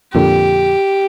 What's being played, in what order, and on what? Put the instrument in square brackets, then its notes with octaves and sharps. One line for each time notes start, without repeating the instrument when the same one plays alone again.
[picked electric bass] F2 A#2 D3 [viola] G4